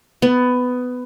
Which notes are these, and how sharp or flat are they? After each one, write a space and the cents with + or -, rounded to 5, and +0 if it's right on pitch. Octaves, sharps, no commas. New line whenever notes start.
B3 +15